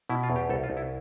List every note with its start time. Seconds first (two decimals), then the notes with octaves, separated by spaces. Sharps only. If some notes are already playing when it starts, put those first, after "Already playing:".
0.09 B2 E4
0.23 F4
0.30 E2
0.36 G4
0.49 C2 A4
0.63 F4
0.70 C2
0.77 E4